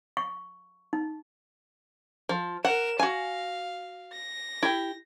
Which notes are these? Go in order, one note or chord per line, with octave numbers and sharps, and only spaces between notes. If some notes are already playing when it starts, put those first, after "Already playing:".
C#6
D#4
F3
A#4 F#5 E7
F#4 F5 G#5
A#6
E4 G4